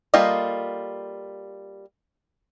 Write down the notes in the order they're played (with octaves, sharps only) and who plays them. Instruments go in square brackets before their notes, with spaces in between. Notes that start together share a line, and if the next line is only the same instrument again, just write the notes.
[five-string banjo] G3 A#3 F4 A4 D#5